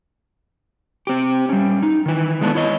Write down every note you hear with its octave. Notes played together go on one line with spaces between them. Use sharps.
C4 G4
G3 C#4
D#4
D#3 E3
G#3 A3 B3 D4
E4 C#5 D#5